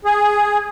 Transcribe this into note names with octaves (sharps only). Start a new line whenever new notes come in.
G#4